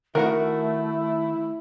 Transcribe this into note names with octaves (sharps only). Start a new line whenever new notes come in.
D#3 A3 E4 F#4 A#4 F#5